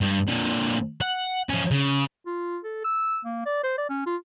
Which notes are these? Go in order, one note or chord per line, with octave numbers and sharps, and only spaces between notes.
G2
A#2 D3
F#5
F3 C#4
C#3
F4
A4
E6
A#3
D5
C5
D5
C#4
F4